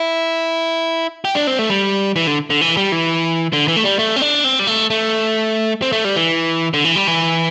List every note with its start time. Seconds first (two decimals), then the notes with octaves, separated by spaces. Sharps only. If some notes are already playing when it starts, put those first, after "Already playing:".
Already playing: E4
1.25 G4
1.35 D4
1.47 C4
1.59 A3
1.70 G3
2.16 E3
2.27 D3
2.50 D3
2.61 E3
2.77 G3
2.92 E3
3.53 D3
3.68 E3
3.76 A3
3.84 G3
3.99 A3
4.16 C4
4.22 D4
4.44 C4
4.59 G3
4.67 A3
4.90 A3
5.82 C4
5.92 A3
6.05 G3
6.16 E3
6.74 D3
6.85 E3
6.96 G3
7.07 E3